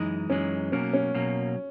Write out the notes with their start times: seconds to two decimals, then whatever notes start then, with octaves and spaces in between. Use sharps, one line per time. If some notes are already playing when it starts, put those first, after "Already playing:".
Already playing: F#2 E3 G#3 D#4
0.29 F#2 E3 G#3 C#4
0.72 B2 F#3 A#3 C#4
0.93 C#4
1.14 B2 F#3 A#3